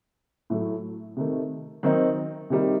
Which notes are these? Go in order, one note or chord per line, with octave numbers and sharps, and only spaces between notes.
A2 F#3 A3
C3 D#3 A3
D#3 F#3 C4 D#4
C3 D#3 G3 D#4